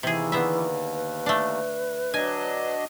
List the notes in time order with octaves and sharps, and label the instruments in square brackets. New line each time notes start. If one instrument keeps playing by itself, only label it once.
[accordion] D#2 [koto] C3 G#4 [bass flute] E3
[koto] D3 B3 E5
[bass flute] B4
[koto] A3 D4
[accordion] F#3 D4 D#5 [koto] G#5